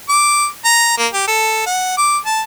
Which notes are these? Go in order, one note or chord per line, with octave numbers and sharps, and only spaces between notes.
D6
A#5
A#3
G4
A4
F#5
D6
A5